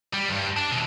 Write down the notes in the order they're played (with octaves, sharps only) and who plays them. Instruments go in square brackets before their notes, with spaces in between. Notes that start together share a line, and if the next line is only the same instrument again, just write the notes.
[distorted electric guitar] G3
E2 G2
D4
B2 E3